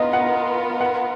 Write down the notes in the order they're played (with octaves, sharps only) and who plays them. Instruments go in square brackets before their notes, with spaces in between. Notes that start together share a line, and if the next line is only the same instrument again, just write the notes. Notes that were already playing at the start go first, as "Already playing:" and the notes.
Already playing: [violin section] B3 F4 A#4 [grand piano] D#5
[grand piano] F#5
F#5